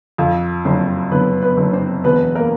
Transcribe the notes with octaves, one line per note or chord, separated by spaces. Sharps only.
F2 F4 F5
F#1 C4 C5
F#1 B3 B4
B3 B4
F#1
C4 C5
E1 B3 B4
A#3 A#4